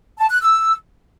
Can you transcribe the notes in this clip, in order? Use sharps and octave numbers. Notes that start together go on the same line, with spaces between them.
A5
F#6
E6